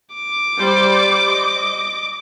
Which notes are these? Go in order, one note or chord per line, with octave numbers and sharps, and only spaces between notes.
D6
G3 C5 D5
D#5